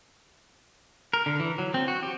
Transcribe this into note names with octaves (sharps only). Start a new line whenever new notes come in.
A#4
D3
E3
F#3
C4
F#4
G4